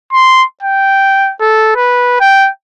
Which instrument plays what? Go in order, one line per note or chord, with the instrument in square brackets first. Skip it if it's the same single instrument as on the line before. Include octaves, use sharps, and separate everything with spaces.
[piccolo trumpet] C6
G5
A4
B4
G5